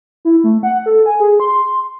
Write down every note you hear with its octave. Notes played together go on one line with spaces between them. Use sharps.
E4
A3
F#5
A4
G#5
G#4
C6